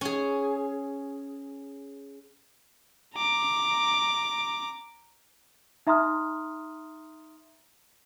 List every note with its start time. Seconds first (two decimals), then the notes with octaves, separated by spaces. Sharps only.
0.01 C#4 G#4
3.17 A#5 D6
5.87 D#4 E5 A#5 C6 D#6 F6